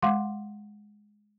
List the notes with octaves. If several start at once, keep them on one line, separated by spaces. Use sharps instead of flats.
G#3 F5 F#5 C6 D6